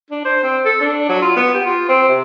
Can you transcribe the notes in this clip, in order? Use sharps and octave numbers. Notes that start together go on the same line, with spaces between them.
D4
C5
C4
A4
D4
F#3
F4
B3
G4
F4
C4
C3